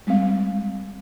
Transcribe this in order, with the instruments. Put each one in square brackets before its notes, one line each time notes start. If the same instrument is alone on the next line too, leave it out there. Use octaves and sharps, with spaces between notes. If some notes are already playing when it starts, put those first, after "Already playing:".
[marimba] G3 G#3 C4 F5